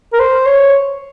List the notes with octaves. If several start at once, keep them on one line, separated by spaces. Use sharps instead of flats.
A#4
C5
C#5